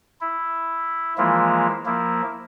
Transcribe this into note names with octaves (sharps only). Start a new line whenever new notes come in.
E4
E3 F3 G#3 A#3 E4 F4
F3 A#3 E4